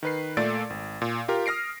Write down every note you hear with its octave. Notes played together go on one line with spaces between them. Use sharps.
D#3 B4 C7
A#2 A3 A4 D5 A6 D7
G#1
A#2
F4 G4 A#4
D#6 F6 A#6 C7 D7